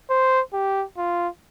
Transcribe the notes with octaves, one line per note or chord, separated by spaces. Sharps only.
C5
G4
F4